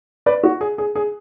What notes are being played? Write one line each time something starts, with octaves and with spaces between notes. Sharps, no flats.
B4 D5
F#4
G#4
G#4
G#4